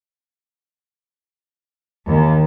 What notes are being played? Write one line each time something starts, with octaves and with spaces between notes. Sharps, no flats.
D#2